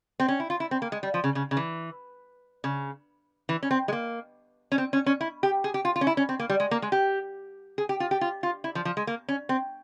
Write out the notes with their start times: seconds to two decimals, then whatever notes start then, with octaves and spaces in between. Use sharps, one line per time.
0.20 C4
0.28 C#4
0.40 E4
0.50 F4
0.60 E4
0.71 C4
0.82 A#3
0.92 G#3
1.03 G3
1.14 F3
1.24 C#3
1.35 C#3
1.51 C#3
1.57 E3
2.64 C#3
3.49 E3
3.63 C#4
3.71 C4
3.88 G#3
3.93 A#3
4.72 C#4
4.78 C4
4.93 C#4
5.06 C#4
5.21 E4
5.43 G4
5.64 G#4
5.74 G4
5.85 F4
5.96 F4
6.01 C#4
6.07 E4
6.17 C#4
6.29 C4
6.40 A#3
6.50 G3
6.60 G#3
6.71 A#3
6.82 G#3
6.92 G4
7.78 G#4
7.89 G4
8.00 F4
8.11 G4
8.21 F4
8.43 F4
8.64 E4
8.75 F3
8.85 F3
8.97 G#3
9.07 A#3
9.28 C#4
9.49 C4